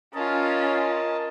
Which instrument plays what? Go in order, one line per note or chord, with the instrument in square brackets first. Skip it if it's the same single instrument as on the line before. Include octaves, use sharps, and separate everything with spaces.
[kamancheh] C#4 F4 [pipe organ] A#4 D#5 A5